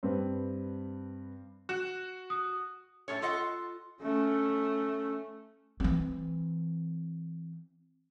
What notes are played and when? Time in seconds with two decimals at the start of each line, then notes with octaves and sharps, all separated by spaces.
0.03 G2 C4 B4
1.69 F#4 E7
2.30 D#6
3.08 A2 A4 C#5
3.22 F4 A4 D#5 F#5
4.02 A3 C#4
5.80 E3 C4